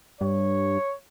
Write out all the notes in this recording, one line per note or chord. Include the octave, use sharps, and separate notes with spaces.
G2 C#5